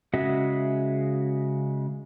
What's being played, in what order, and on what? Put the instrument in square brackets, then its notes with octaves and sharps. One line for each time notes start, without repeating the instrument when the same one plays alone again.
[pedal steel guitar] C#3 G#3 F#4 D#5 E5